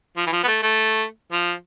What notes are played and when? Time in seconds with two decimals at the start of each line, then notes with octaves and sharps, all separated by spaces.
0.17 F3
0.27 E3
0.33 F3
0.43 B3
0.48 A3
0.62 A3
1.32 F3